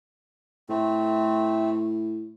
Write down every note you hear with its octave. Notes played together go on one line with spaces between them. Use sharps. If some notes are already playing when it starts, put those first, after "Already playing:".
A2 A3 C4